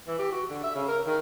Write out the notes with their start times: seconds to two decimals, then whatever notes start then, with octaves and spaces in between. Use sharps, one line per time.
0.08 E3
0.19 G4
0.32 F#4
0.50 D3
0.63 E5
0.75 C#3
0.88 A#4
1.07 D#3